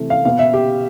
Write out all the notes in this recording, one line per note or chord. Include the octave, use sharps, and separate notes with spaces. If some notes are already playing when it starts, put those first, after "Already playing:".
Already playing: C3 E3 A3
F5
B2 B3 F5
E5
G4